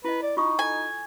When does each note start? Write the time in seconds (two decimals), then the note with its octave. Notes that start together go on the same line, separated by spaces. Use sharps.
0.04 E4 B4 D#5
0.23 D5
0.37 D#4 F4 C#6 D#6
0.59 A4 G#5